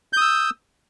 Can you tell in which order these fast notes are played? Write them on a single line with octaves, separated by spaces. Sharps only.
G6 D#6 E6